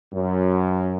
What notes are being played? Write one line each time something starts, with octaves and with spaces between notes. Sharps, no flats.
F#2